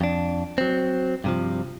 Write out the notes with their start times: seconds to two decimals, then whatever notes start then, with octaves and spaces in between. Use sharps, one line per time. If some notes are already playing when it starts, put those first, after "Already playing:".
0.01 F2 D4
0.58 F#3 C4
1.24 G2 C3 F3